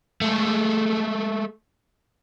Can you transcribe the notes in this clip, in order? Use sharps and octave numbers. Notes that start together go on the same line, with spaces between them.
G#3 A3